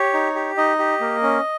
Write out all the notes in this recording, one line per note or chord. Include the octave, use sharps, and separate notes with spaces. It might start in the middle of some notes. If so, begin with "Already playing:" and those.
Already playing: G4 C#5
D#4
G4
D#4 D#5
G4
A#3
C#4